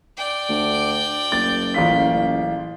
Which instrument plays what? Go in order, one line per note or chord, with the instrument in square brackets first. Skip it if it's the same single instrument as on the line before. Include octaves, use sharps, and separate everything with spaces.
[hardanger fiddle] D5 G5
[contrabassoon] D2
[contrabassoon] F#1 [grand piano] A6
[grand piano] A1 F4 B6